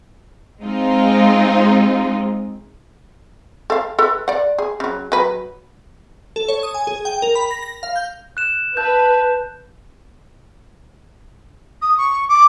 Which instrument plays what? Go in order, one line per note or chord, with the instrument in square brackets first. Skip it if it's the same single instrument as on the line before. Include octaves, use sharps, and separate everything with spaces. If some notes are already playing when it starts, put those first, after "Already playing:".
[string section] G#3 C4 D#4 F4
[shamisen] A4 F5
A4 B4
D5 F#5
G#4
C#3 F#3
F#3 B4
[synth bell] A4
C#5
D#6
G#5
G#4
G5
A#4
B5
A#6
A#6
F5
G6
[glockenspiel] F#6 E7
[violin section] B4 [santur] E5 A5 [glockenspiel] G6
[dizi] D#6
C#6
D6